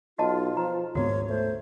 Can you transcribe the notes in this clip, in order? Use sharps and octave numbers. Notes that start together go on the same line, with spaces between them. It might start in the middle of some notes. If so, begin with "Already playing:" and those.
B1 F4 F#4 D#5 A5
F3 A#5
G#1 D2 G#2 B3 F#4 C#5
A3 C5